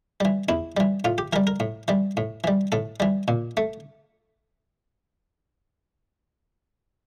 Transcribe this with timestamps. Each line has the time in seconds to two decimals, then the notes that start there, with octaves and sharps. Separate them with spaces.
0.20 E3 G3
0.49 E2 E4
0.77 E3 G3
1.05 A2 F4
1.18 G4
1.33 E3 G3 A#4
1.47 A#4
1.60 A2
1.88 E3 G3
2.17 A2
2.44 E3 G3
2.72 A2 A4
3.00 E3 G3
3.28 A#2
3.57 A3